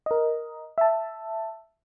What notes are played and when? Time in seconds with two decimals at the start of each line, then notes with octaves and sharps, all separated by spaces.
0.06 A#4 D#5
0.78 E5 A5